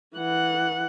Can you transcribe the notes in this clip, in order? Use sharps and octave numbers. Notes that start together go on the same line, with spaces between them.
E3 F#5